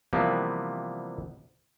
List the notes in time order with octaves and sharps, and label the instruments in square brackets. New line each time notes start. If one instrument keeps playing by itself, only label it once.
[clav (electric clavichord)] C3 E3 F3 G3 A#3 B3